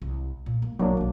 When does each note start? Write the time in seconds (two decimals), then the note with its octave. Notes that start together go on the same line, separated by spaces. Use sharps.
0.02 C2
0.46 A#2
0.62 A#3
0.79 B1 D#3 F#3 A#3 D4
0.97 B1 F#2